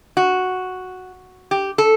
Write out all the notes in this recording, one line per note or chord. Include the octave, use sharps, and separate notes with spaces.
F#4
G4
A4